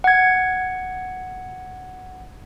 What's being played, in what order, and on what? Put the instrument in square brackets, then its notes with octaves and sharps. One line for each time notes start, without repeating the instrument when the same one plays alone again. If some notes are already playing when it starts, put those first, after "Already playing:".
[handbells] F#5 G#6